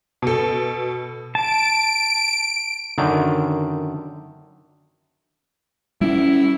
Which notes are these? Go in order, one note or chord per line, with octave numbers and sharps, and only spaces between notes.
B2 A4
A5 D7
F#2 D3 D#3
G3 C#4 E4